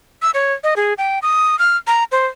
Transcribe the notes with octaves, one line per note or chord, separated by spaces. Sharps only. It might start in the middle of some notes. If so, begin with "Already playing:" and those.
E6
C#5
D#5
G#4
G5
D#6
F6
A#5
C5